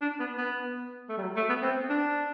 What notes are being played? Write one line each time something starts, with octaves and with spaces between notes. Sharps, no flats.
D4
B3
B3
A3
G3
F#3
A3
B3
C4
D4